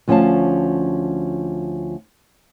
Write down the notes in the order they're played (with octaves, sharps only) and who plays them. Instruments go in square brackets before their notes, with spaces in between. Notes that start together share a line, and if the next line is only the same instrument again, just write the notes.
[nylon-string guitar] D2 F3 C#4 F4 F5 A5